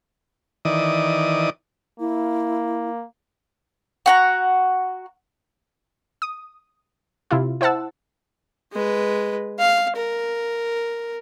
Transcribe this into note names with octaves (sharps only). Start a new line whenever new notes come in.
D#3 E3 D5 D#6
A#3 E4
F#4 F#5 A#5
D#6
C3 E4 F4
E4 C5 F#5 A5 E6
G#3 B4
F5
A#4